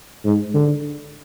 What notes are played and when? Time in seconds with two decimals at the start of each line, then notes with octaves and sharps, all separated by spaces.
0.25 G#2
0.54 D3